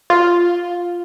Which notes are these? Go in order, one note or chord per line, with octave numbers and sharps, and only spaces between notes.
F4